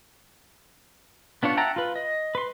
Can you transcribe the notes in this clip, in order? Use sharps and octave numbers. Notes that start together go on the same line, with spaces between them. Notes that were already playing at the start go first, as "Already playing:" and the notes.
B3 D4 F4 C#5
E5 F#5 G5 A5 A#5
F4 B4
D#5
B4 C6